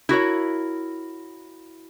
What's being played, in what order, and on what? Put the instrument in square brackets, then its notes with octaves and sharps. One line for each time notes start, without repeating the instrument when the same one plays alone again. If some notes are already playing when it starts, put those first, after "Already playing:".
[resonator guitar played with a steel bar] E4 F#4 A#4 C#5